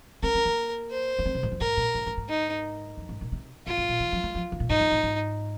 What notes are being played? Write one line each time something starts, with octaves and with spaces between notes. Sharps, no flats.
C4 A#4
C4
A#3
C5
D#4
C4
C3
G#2
F2
G#2 A#4
A#2
G#2
G#2
G#2
D#4
F2
G#2
A#2
C3
G#2 F4
G#2
A#2
D#3
F3
G#3
F3
D#3
A#2
G#2 D#4
F2
G#2
G#2